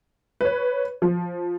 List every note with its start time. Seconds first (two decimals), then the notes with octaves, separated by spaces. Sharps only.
0.41 B4 C#5
1.02 F3